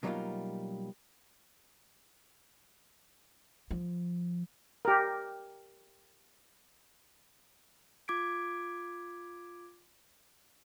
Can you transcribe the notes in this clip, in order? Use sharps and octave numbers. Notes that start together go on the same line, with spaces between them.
B2 F#3 G3 A#3 D#4 F4
F3
G4 A#4
F4 D6 G#6 B6 D7